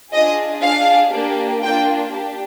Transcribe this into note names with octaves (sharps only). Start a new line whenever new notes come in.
D4 F4 G#4 D#5
D4 G#4 F5
A#3 D4 G4
A#3 D4 F4 G5
D4 G4